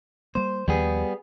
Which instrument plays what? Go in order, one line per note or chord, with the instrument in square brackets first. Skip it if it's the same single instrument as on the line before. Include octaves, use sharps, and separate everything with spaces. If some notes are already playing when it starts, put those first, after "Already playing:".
[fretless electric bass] G3 A#3 [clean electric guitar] C5
[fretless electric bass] D#2 D#3 F3 [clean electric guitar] G3 B3 G#4